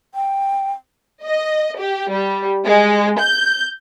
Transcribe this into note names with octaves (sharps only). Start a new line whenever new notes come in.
G5
D#5
G4
G3
G#3
G6